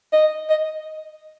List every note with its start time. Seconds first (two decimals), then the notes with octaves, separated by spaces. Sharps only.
0.13 D#5
0.50 D#5